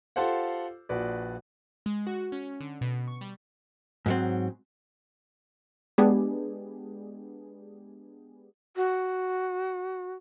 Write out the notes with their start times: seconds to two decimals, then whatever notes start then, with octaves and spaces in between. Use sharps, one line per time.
0.16 F4 G4 A4 C5 F5 F#5
0.89 A#1 F3 F#4 B4 D5
1.86 G#3
2.07 F#4
2.32 C#4
2.60 D3
2.81 B2
3.08 C#6
3.21 G3
4.06 G#2 F#3 C4
5.98 G#3 B3 D4 G4 G#4
8.76 F#4